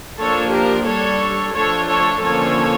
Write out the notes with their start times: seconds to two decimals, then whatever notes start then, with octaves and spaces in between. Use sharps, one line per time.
0.18 F3 A#3 D4 A4 C#5
0.52 G4 A#4
0.85 G3 D4 A4 C#5
1.53 F3 A3 D4 A4 C#5
1.87 A4 C#5
2.21 D3 F3 A#3 C#4 A4 C#5